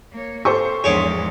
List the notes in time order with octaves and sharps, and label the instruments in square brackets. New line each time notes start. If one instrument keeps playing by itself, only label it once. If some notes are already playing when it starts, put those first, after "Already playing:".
[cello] A#3 C#5
[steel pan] G4 [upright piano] A4 C5 C#6 [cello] F5
[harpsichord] A#1 D4 C#5 [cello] E2 G#2 [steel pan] G#4